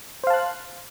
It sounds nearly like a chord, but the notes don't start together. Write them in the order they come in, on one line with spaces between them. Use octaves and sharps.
C5 F5 A5 F#6